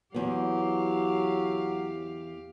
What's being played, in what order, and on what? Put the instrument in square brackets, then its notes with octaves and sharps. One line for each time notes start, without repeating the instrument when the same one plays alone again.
[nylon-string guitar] E2 B3 [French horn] F#3 [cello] G4 F5